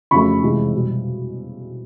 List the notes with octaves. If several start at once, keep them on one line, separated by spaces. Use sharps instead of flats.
F2 C#3 F#3 A3 B5 C#6
E2 C3 F3 G#3
B2 G3